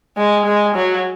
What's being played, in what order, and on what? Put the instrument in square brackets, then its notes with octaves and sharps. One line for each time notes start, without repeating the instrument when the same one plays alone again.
[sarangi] G#3
G#3
F#3